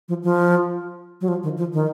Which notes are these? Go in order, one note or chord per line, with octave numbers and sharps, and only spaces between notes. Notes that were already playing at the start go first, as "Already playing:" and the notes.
F3
F3
F#3
F3
D#3
F3
D#3